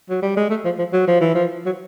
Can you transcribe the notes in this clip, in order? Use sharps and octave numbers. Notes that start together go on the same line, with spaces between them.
F#3
G3
G#3
A3
F3
F3
F#3
F3
E3
F3
F#3